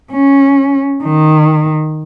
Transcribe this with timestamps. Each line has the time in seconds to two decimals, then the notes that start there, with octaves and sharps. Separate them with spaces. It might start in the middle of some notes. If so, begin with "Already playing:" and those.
0.12 C#4
1.03 D#3